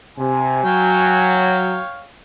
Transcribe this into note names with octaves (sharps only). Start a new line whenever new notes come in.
C3 G#5
F#3 C#5 F5 G5